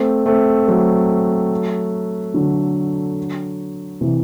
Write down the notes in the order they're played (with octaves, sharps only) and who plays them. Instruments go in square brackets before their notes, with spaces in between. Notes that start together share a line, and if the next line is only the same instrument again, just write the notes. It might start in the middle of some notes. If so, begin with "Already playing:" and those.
Already playing: [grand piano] A3 C4
A3 C4
F#3 A3
D3 F#3
C3 E3